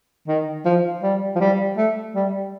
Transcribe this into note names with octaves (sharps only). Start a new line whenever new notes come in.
D#3
F3
G3
F3
G3
A3
G3